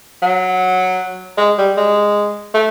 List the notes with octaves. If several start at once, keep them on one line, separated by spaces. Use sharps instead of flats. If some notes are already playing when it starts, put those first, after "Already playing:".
F#3
G#3
G3
G#3
A3